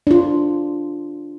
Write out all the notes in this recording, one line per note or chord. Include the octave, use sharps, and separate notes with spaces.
D4 F4